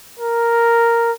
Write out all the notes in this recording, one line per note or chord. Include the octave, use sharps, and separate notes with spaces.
A#4